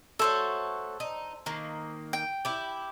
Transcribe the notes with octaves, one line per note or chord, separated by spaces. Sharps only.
A3 F#4 A4 C5 C#5
D#4
D#3 A#3
G5
E4 G4